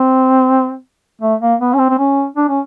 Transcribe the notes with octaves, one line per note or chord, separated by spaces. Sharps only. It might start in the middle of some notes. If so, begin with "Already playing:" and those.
Already playing: C4
A3
A#3
B3
C#4
C4
C4
C#4
D4
C#4